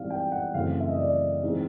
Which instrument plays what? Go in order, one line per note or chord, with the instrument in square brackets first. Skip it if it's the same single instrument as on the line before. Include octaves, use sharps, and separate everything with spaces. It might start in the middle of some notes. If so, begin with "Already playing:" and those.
Already playing: [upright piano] G#2 E3 G3 C4 F5
G5
F#5
F#2 C#3 E3 A3 C4 F5
E5
D#5
D5
G#2 E3 G#3 C4